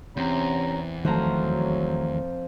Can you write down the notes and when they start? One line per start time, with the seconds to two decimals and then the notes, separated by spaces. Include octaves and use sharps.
0.17 E2 C3 C4 C#4 A#5
1.04 F2 D#3 F3 F#3 A3 A#5